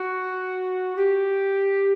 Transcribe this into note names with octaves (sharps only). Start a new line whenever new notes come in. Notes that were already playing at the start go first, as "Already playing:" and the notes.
Already playing: F#4
G4